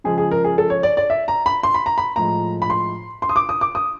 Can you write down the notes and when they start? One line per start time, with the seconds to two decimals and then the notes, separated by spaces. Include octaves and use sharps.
0.04 C#3 F3 G#3 G#4
0.18 G#4
0.31 A#4
0.44 G#4
0.58 A4
0.70 C#5
0.83 D5
0.97 D5
1.10 E5
1.28 A#5
1.46 B5
1.63 C6
1.74 B5
1.86 A#5
1.98 B5
2.16 A2 F3 G#3 A#5
2.62 B5
2.70 C6
3.22 C6
3.29 D#6
3.36 D6
3.49 D#6
3.61 D6
3.75 D#6